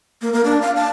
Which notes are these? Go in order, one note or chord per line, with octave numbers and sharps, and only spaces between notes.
A#3
A#3
D4
F5
A5